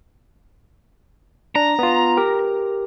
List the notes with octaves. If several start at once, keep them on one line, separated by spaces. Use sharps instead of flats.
D4 A#5
B3 F4
G4 A#4